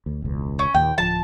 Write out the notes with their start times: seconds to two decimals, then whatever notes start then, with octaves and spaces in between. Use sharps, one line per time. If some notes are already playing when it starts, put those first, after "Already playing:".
0.06 D2
0.22 E1 C#2
0.59 C#4
0.74 D#2 A#2 G5
0.98 D1 F3 A5